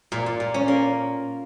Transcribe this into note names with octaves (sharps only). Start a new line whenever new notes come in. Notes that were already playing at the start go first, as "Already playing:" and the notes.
A#2
A#2
A#2
C#4
A#3